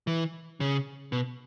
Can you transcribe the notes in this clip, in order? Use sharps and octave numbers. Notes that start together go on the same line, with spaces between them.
E3
C#3
B2